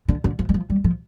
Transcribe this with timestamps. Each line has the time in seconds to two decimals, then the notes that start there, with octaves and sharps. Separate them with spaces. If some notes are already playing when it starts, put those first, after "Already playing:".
0.08 D3
0.24 D3
0.39 F3
0.49 G3
0.54 F3
0.70 G3
0.84 F3